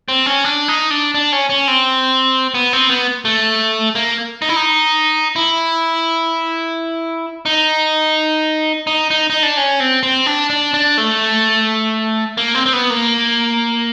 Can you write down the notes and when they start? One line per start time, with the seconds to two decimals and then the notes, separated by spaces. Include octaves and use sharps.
0.09 C4
0.26 C#4
0.44 D4
0.68 D#4
0.90 D4
1.15 D4
1.33 C#4
1.50 C#4
1.68 C4
2.54 B3
2.73 C4
2.90 B3
3.25 A3
3.95 A#3
4.42 D#4
4.49 E4
4.56 D#4
5.36 E4
7.46 D#4
8.87 D#4
9.11 D#4
9.30 D#4
9.43 D4
9.57 C#4
9.80 C4
10.03 C4
10.26 D4
10.50 D4
10.74 D4
10.98 A3
12.37 A#3
12.55 C4
12.66 C4
12.73 B3
12.90 A#3